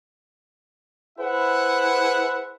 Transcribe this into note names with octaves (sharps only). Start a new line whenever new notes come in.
E4 G#4 B4 C5 E5 F#5